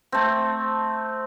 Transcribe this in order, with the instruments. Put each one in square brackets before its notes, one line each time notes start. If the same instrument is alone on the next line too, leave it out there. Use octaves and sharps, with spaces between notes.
[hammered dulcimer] A3 C4